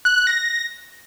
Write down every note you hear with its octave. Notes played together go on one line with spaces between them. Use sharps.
F#6
F#6
A#6